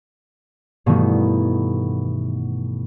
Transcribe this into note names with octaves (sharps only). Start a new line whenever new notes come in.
G2 B2 D#3 E3 A3 B3